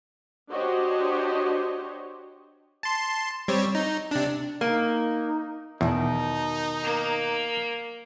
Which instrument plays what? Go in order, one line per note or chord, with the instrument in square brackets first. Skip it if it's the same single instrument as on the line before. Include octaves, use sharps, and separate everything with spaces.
[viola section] D4 F#4 G4 C5 C#5 D#5
[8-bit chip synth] A5 C6
G3 C4 C#5
D#4
C3 D4
[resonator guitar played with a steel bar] A#3 [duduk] D#4
[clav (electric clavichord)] E2 [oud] B2 D#3 [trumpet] D#4
[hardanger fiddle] A#3